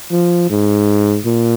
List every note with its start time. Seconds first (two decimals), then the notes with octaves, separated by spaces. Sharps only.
0.12 F3
0.50 G#2
1.26 A#2